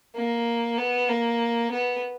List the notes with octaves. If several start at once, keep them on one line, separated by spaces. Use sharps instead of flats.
A#3
B3
A#3
B3